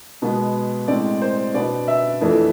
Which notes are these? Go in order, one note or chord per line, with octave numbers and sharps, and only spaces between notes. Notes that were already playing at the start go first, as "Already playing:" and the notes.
B2 G#3 B3
A2 G#3 C4 D5
C5
B2 B3 D4 D5
E5
F2 E3 A3 D4